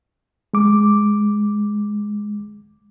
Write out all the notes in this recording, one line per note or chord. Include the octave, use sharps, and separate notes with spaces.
G#3 D6